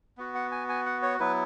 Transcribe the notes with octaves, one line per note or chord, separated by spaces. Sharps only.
B3 F#4
F#5
G#5
G#5
F#5
C#5
F#3 B3 E4 B4